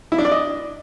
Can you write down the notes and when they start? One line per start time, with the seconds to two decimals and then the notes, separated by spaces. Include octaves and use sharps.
0.12 E4
0.18 D4
0.25 D5
0.32 D#5